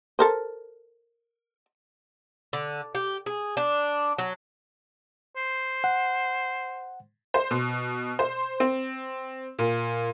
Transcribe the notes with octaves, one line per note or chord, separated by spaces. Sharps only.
A4 A#4 C5
D3
G4
G#4
D4
F#3
C5
F#5
C5
B2
C5
C4
A#2